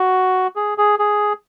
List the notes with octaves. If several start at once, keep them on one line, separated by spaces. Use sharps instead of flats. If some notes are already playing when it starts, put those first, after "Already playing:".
Already playing: F#4
G#4
G#4
G#4